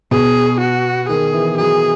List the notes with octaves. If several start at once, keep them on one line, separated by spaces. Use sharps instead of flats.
B2 G#4
F#4
D#3 G#4
E3
F#3 G#4